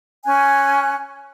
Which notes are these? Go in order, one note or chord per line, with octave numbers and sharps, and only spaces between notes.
C#4 G#5 F#6